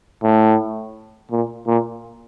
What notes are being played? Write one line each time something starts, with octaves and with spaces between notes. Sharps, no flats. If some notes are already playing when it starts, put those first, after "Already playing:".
A2
A#2
A#2